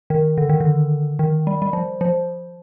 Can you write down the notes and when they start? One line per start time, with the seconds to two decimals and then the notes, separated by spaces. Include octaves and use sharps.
0.10 D#3
0.37 D3
0.49 D#3
0.60 D3
1.19 D#3
1.47 G3
1.62 G3
1.73 F3
2.01 F3